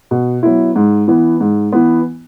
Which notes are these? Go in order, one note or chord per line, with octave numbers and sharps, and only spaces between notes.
B2
F#3 B3 E4
G#2
E3 B3
G#2
E3 B3